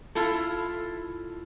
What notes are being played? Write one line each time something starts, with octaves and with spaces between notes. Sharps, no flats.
E4 F4 A4